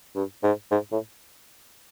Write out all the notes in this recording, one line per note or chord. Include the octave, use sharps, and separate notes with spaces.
G2
G#2
G#2
A2